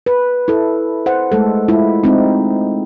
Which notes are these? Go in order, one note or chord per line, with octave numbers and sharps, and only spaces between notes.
B4
E4 A4
C5 F#5
G#3 A3 A4
G#3 E4 F4
G#3 C4 D#4